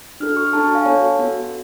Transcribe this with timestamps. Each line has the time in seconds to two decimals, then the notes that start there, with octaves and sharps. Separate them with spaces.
0.20 D4 F#4 A4 F6
0.36 C#6 F6
0.53 D4 F#4 A4 A5 C#6
0.64 A5 C#6
0.75 F5 G#5
0.86 B3 F#4 A4 C#5
1.19 B3 F#4 A4